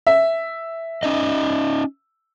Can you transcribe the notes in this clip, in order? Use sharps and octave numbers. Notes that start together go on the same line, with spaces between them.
E5
C#4 D#4 D#5